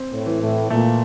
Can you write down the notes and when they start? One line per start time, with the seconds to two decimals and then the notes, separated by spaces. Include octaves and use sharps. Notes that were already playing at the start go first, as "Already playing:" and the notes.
Already playing: C4
0.11 A2
0.26 E3
0.41 A2
0.70 A#2 A3